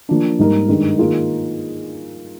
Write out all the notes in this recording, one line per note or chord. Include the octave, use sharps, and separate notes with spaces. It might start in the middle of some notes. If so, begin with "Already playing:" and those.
F3 A#3 D4
G#2 G3 A#3 D#4 A#4
G2 D#3 G#3
D#3 A#3 F4 G#4